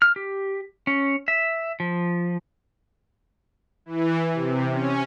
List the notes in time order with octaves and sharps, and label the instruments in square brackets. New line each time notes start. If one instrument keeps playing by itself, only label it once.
[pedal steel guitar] F6
G4
C#4
E5
F3
[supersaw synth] E3
C3
C#4